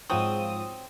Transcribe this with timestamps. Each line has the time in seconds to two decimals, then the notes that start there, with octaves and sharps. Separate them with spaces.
0.10 G#2 F3 F#3 C4 D#6